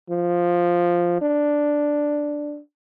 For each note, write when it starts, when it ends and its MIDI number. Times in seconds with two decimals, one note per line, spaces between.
0.10 1.18 53
1.22 2.60 62